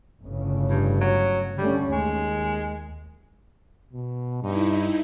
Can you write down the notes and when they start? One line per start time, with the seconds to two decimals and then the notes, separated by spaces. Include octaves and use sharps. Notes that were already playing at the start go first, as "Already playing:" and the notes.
0.23 G1 A2 C#3
0.70 G2
1.01 F#3
1.58 D3 G3 A3 C#4
1.92 D#2 G#3
3.93 B2
4.42 G2 D#4 E4